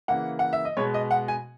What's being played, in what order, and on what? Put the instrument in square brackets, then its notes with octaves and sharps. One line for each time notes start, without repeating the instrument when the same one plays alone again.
[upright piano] C#3 E3 A#3 F#5
F#5
E5
D#5
B2 G#3 B3 C#5
D#5
F#5
G#5